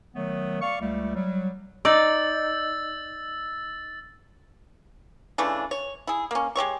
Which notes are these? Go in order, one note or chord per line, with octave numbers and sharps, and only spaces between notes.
D#3 F#3 A3 B3
D5 F5 C#6
C#2 G3 A3
F#3 G3
D#4 D5 E6 A6
C#3 E3 A3 D4
C#5
E4 G#4
A#3 C#4
G#3 G4 C#5 C#6